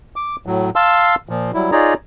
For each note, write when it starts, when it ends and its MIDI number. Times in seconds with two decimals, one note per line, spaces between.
0.16 0.36 86
0.46 0.70 45
0.46 0.70 54
0.76 1.15 77
0.76 1.15 81
0.76 1.15 84
0.76 1.15 88
1.29 1.51 46
1.29 1.51 53
1.54 1.70 54
1.54 1.70 55
1.54 1.70 64
1.72 1.94 63
1.72 1.94 65
1.72 1.94 68
1.72 1.94 73
1.72 1.94 74
1.72 1.94 82